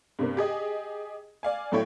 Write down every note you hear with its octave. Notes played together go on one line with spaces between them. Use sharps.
G2 C3 A#3
G4 G#4 D#5
D5 F5 G#5
A2 F#3 A3 E4 C#5 G5